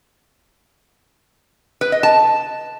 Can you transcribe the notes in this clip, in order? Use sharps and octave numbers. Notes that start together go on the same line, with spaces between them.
B4
D#5
A5